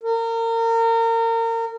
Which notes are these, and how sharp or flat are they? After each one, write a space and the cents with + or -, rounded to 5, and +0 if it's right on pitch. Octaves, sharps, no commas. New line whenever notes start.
A#4 -30